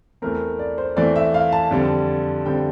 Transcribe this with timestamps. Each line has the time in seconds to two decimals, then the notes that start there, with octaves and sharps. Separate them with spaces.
0.22 E2 E3 A3 C4 A#4
0.59 D5
0.78 C5
0.97 E2 E3 A3 C4 D5
1.16 E5
1.34 F5
1.52 A5
1.71 F2 D3 G3 C4
2.45 F2 D3 G3 C4 G5